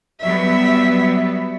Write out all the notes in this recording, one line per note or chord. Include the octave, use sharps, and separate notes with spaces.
F#3 G3 B3 E5